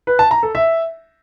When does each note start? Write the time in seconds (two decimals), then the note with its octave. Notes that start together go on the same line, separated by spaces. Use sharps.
0.07 B4
0.19 A5
0.31 A#5
0.43 A4
0.55 E5